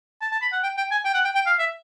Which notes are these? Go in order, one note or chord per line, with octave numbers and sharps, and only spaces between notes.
A5
A5
B5
F#5
G5
G5
G#5
G5
F#5
G5
G5
F5
E5